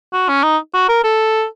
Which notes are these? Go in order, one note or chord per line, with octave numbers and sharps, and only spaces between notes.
F#4
C#4
D#4
F#4
A#4
A4